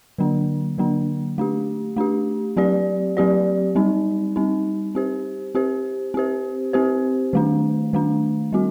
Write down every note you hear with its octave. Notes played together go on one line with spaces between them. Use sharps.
D3 F#3 A#3 D4
D3 F#3 A#3 D4
A3 D4 G4
A3 D4 G4
F#3 C4 G4 D5
F#3 C4 G4 D5
G3 C4 D#4
G3 C4 D#4
C4 G4 C5
C4 G4 C5
C4 G4 C5
C4 G4 C5
D#3 A3 D4
D#3 A3 D4
G3 C4 F#4